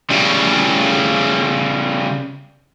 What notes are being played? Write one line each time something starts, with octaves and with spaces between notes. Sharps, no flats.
C#3 G3